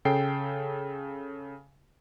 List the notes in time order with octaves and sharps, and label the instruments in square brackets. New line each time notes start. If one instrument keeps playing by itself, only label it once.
[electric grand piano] C#3 A4 G5 C7